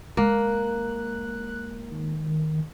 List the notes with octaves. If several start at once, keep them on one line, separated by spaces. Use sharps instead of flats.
G#3 A#3 F#6
D#3